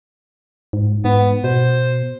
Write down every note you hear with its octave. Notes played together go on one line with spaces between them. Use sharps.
G#2
G#2 B3
B2 C5